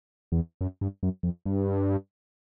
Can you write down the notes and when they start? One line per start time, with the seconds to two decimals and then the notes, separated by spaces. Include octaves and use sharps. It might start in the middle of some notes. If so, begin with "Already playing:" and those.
0.32 E2
0.61 F#2
0.81 G2
1.03 F#2
1.23 F2
1.46 G2